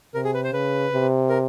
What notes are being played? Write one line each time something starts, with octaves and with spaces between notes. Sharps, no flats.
C3 A#4
G#4
B4
C5
C#3 B4
C3
A#4